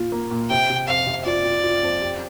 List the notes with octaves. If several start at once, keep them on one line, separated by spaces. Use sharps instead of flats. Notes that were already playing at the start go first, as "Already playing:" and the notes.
Already playing: A#2 F4
A#3
A#2
C3 G5
C3
F2 F5
C3
F4 D5
F4
F4
F2
G4